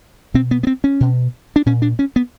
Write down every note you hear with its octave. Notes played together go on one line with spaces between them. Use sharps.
B2 C4
B3
B3
C4
C#4
B2
D4
A#2 C#4
D4
C#4
B3